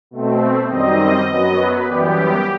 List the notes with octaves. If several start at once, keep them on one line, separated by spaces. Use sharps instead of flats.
B2 A3 C4
F#2 D#3 G3 C4 D#5
F#2 F#3 B3 D#5
B4
F#2 E3 G3 B3 G4